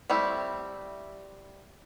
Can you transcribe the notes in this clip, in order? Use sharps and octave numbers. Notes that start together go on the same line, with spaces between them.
G3 A3 C4 E4